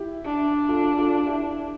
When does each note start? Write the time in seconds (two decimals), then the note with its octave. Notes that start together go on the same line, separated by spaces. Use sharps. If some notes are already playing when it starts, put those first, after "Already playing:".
Already playing: E4 G4
0.25 D4
0.69 F4 A4
0.98 F4 A4
1.26 E4 G4